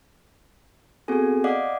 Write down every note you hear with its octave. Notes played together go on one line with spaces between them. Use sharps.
B3 C4 F#4 G#4 A4 G#5
D5 D#5 F5 F#5 D6 D#6